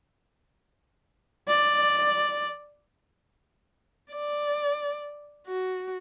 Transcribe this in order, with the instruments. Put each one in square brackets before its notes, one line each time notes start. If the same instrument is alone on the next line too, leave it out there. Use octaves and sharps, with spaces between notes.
[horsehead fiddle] D5
[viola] D5
F#4